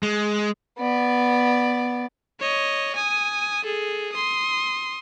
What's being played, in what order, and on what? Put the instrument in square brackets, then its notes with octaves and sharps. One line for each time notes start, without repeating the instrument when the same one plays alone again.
[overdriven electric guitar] G#3
[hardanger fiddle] B3 D5
[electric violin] C#5 D#5
G#5 D#6
G#4 A4
C6 D#6